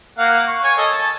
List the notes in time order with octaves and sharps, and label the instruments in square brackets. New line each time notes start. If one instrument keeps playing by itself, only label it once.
[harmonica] A#3 F5 F#5
C#6
C#5 G#5
A4 D#5
A5